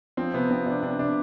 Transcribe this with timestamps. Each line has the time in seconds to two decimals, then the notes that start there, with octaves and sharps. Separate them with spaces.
0.17 F3 C4
0.34 C3 B3
0.50 F3 C4
0.66 C3 D4
0.83 C3 D4
0.99 C3 D4